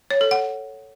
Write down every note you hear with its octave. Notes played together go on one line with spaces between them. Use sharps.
C#5
A4
F#5